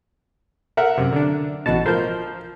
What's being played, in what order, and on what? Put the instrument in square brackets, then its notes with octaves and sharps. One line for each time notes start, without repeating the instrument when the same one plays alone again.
[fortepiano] A#4 E5 F#5
[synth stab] F#2 C3
D3 D4
[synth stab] A1 F#4 A5 [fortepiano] B2
[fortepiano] F3 A#4 [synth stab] C5 G6